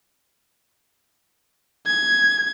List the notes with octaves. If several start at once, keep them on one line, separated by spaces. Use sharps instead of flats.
G#6